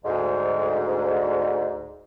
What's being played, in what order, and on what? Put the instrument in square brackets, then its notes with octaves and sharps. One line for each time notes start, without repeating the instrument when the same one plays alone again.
[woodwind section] D2 G#2